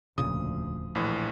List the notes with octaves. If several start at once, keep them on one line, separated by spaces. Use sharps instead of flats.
E1 D2 A#2 C#3 F3 D#6
A#1 A2 E3